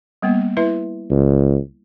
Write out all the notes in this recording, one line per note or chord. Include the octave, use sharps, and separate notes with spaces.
G3 A#3 B3
E4 B4 E5
C#2